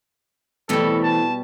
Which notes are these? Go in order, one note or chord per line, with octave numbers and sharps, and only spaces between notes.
B2 E3 G3 A3 C4 A4
A5